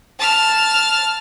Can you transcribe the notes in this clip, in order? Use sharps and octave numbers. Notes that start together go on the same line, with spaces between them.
A5 F6